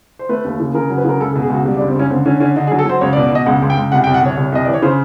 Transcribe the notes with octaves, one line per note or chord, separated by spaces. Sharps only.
C5
A3 B4
D#2
C#3
C#3 A#4
F#3
B4
C#3 A#4
C#2 A4
A4
B2
G#4
C#2 F#4
G3
D4
C#2
C4
C#2 C#4
D3 C4
D3 C#4
D3 C#4
D3 D#4
G#4
F#3
A4
F#3 C5
C#2 C#5
D5
B2
D5
B2 D#5
C#2 F#5
C#2
G5
C#2
C2 F#5
G5
C2
F#5
C2 C#5
C2
C2 D#5
E3 D5
C#5
C#3 C5